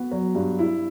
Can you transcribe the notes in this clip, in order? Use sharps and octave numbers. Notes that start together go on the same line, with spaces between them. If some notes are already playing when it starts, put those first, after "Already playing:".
Already playing: B3 F#4
F#3
G2
E4